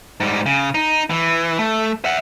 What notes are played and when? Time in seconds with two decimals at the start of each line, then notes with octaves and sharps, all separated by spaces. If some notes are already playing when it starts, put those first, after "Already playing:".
0.20 G#2 G3
0.46 C#3
0.75 D#4
1.10 E3
1.59 A3
2.05 E5 F#5